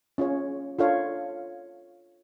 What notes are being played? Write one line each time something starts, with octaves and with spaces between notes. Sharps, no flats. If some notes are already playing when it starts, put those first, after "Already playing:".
C#4 F4 G#4 C#5
D4 F4 A4 C#5 F5